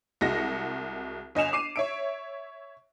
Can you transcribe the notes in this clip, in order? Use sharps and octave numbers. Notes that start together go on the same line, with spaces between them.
C2 G#3 F#4 A#6
G1 D#5 G#5 E7 F7
D6 C7 D#7
C#5 E5 D7